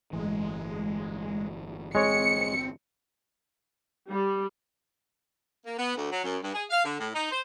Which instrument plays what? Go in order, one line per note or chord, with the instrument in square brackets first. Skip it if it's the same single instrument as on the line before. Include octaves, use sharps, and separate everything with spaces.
[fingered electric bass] G1 A2 E3 [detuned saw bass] G#3
[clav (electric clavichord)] G#3 C#5 [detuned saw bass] C4 [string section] C#7
[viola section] G3
[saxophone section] A#3
B3
D2
F#3
F#2
G2
G#4
F5
D3
A2
D#4
C5